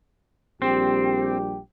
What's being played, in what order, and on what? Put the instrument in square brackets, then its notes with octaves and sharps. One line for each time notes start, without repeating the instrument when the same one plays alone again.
[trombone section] A#1 G3 G4 [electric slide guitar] C4